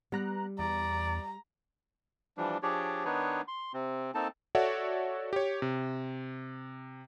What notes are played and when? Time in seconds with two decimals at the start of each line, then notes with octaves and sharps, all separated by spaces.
0.12 G3 B3 A#5 F#6
0.59 E2 D5 A#5
2.37 E3 F3 G3 D4
2.63 F3 D4 G4 G#4 C#5 D5
3.05 D#3 B3 D4 D#4 B4 C#5
3.48 C6
3.73 C3 C4
4.14 A#3 C4 D#4 A4 A5
4.55 F#4 A4 C#5 D5 E5 F#5
5.33 G4 C#5
5.62 C3